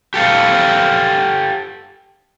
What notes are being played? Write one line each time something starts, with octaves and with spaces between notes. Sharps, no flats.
G4 A4 F5